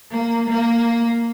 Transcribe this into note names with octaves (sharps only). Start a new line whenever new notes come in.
A#3
A#3